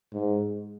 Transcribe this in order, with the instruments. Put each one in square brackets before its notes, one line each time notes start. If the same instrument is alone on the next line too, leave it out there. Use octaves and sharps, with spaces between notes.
[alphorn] G#2